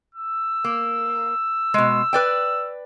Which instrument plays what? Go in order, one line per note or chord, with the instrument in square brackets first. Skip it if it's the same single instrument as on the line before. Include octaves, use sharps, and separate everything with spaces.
[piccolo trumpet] E6
[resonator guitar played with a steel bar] A#3
B2 G#3
B4 D5 G5